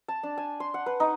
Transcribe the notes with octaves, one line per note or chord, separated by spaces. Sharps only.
A5
D4
G#5
C6
F#5
B4
D#4